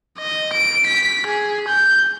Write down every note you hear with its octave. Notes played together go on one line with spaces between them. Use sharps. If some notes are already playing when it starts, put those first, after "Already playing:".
D#5
D7
B6
G#4
G6